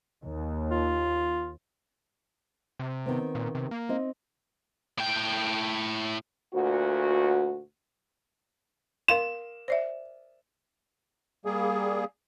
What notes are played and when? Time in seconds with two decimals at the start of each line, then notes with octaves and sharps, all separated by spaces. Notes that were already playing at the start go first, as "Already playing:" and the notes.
0.24 D#2
0.71 F4
2.79 C3
3.06 D#3 B3 C4
3.35 A#2
3.55 C3
3.71 A#3
3.89 C4 D#4 D#5
4.98 A2 G5
6.54 D2 A#2 F#4
9.08 A#4 F5 C6 E7
9.68 C5 D5 E5
11.45 G3 A#3 G#4